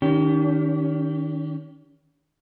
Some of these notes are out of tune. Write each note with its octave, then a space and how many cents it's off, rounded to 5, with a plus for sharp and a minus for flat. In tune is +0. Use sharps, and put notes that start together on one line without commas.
D#3 +0 C#4 +45 G4 -5